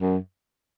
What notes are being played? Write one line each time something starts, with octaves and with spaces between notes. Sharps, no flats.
F#2